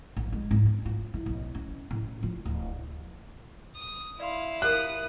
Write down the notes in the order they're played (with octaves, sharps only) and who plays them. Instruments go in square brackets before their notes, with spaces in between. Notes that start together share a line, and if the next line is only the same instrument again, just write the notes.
[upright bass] A#1
G#3
G#2
C#4
F4
E3
B1
C#4
A2
F3
D1
[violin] D#6
[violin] E4 [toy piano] D5 C6 [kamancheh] F5
[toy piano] A#4 F5 [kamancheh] D#6 [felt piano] F#6